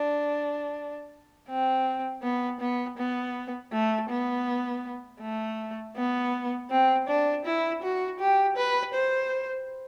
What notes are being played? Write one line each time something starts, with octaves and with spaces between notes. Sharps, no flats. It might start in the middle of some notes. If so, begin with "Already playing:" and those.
Already playing: D4
C4
B3
B3
B3
A3
B3
A3
B3
C4
D4
E4
F#4
G4
B4
C5